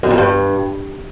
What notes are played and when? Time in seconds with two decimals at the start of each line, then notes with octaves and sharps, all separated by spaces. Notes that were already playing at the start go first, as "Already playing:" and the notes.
0.03 F#2
0.10 F2
0.18 G2